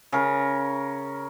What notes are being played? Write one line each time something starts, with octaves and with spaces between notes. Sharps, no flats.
C#3 A#4